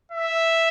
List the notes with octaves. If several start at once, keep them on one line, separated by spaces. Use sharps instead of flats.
E5